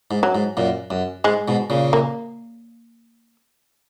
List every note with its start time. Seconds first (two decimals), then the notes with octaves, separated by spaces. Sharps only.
0.11 G#2
0.23 F#3
0.35 G#2
0.57 F#2 A#2
0.91 F#2
1.24 G#2 G#3
1.48 G#2 B2
1.70 A#2 C#3
1.93 A#3